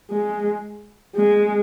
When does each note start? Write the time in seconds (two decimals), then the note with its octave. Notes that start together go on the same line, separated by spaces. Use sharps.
0.11 G#3
1.16 G#3